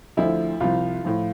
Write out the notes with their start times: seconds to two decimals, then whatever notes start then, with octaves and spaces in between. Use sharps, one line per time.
0.17 D2 D3 F3 E4
0.60 C2 C3 F3 F4
1.05 A2 F3